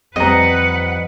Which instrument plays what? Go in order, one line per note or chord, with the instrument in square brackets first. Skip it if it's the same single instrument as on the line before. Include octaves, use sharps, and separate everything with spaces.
[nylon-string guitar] F2 G3 C4 [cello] B4 F#5 [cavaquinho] D#5 A#5